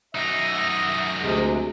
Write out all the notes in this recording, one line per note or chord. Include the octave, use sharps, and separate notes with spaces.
F#2 D#4 F#4 E5 A#6
D2 C3 G#3